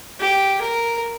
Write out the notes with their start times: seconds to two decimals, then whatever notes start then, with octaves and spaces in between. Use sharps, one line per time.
0.20 G4
0.62 A#4